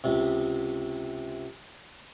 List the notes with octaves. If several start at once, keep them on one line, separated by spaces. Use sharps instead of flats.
C#2 C3